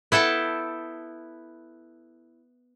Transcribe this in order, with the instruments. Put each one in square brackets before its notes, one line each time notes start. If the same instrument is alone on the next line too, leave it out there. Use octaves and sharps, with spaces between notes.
[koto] B3 E4 A4 G5 A5